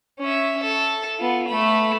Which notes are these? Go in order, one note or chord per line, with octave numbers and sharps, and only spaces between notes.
C#4 E5
A4
B3 F4
A3 B5